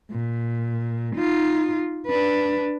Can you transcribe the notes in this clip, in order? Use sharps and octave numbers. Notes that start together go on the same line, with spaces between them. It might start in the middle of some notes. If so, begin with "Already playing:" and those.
A#2
D#4 F4
D4 B4